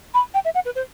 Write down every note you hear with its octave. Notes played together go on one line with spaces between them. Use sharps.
B5
G5
E5
F#5
B4
C5